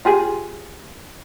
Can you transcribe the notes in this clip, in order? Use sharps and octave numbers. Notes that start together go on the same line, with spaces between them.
F4 G4 G#4